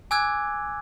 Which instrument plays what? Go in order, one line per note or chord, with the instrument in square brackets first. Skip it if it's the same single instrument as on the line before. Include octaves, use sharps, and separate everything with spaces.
[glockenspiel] G#5 D6 E6 F#6 G#6